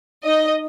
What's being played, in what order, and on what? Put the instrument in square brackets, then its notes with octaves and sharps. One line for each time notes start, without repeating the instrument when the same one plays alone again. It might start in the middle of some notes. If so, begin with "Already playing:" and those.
[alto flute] D#4 [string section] D#5